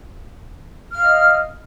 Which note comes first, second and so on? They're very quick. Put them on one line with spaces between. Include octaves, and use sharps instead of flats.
F6 F5 D#5